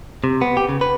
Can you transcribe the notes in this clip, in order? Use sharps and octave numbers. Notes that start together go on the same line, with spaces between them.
C3
B3
G4
C#3
B4